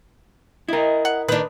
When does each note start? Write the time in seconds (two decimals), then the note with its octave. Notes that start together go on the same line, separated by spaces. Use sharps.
0.68 E4 A#4 D#5
1.05 F#5
1.28 D#3 D4 B4